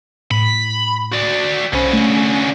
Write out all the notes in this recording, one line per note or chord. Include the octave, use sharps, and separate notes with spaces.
A2 B5
F#4 D5
B1 D3 C#4 C5 B5
A3